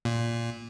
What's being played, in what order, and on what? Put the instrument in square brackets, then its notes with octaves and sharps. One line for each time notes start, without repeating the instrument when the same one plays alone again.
[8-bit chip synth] A#2